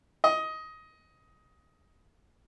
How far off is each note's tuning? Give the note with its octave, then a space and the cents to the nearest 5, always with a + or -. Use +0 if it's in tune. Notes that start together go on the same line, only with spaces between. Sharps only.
D#5 +15